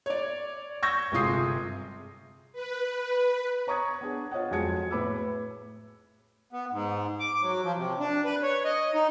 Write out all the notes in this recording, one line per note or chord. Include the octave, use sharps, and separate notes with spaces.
C#5 D5
C#6 E6 G6 G#6 A#6
G1 C3 G#3 F4 D#6 C7
B4
C#5 A#5 C#6 D#6 G#6
B3 D4 G#4
F4 C#5 D#5 F#5
F2 F#3 G#3 G#4 G#6 C#7
A2 B4 B5 D6 E6
B3
G#2
D6
F#3
F3
C3
D4
B4
C#5
D#5
D#4